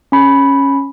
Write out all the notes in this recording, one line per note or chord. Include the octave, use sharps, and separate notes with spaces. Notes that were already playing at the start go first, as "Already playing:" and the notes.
C#4 B5